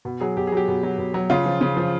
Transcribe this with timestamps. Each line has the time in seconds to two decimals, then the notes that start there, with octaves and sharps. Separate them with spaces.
0.05 B2
0.21 F#3 G#4
0.37 B2 G4
0.47 G#4
0.52 F#3 G4
0.68 B2
0.83 F#3
0.98 B2
1.14 F#3
1.30 C#3 F4
1.46 F3
1.61 C#3
1.77 F3